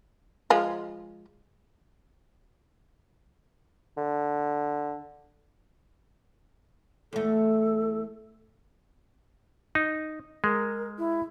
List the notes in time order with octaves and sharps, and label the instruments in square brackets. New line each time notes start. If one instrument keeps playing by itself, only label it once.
[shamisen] F3 G#3 F4
[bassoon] D3
[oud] E2 A3 [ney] A4
[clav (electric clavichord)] D#4
[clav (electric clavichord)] G#3 [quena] A#4
[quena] E4